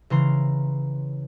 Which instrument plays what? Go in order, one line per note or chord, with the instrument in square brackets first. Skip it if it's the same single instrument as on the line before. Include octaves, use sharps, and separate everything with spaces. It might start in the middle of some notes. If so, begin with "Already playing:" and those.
[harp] C#3 E3 A#5 C6